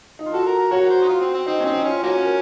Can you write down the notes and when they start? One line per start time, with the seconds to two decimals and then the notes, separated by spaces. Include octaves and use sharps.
0.19 D#4
0.26 F4
0.33 F#4 A4
0.45 A#4
0.58 A#4
0.71 F#4 C#5
0.83 A#4
0.90 C5
1.02 D#4
1.09 F4
1.21 C4
1.34 C4
1.46 C4 D#4
1.60 C#4
1.65 C4 D#4
1.78 D#4
1.84 C#4 F4
2.03 F3 A#3 C#4 F#4
2.22 A#4